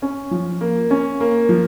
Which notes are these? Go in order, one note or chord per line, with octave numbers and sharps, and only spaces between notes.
C#4
F3
A#3
C#4
A#3
F3